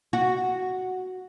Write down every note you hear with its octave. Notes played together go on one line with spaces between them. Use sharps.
F#4